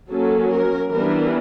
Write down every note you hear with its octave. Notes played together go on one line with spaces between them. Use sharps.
F#3 A#3 C#4 A4
A#4
E3 G3 B3 D4 A#4